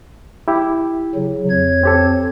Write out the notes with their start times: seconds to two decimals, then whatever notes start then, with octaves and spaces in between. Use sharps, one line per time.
0.48 E4 G4
1.15 C#3 F#3
1.50 F2 C#5 G#6
1.83 C4 G4 A4